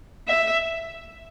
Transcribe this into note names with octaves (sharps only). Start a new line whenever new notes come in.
E5